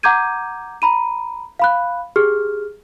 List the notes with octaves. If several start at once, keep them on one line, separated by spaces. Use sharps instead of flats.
F#5 A#5 D6 G6 G#6 D#7
A#5 B5 D#7
F5 B5 F#6
G4 G#4 F6